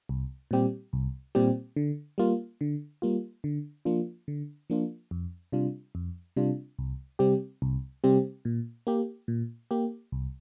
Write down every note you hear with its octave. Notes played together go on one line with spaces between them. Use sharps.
C2
A#2 G3 C4 G4
C2
A#2 G3 C4 G4
D3
G3 A#3 F4
D3
G3 A#3 F4
D3
F3 A#3 D4 F4
D3
F3 A#3 D4 F4
F2
C3 G3 D4 F4
F2
C3 G3 D4 F4
C2
C3 G3 C4 G4
C2
C3 G3 C4 G4
A#2
A#3 G4
A#2
A#3 G4
C2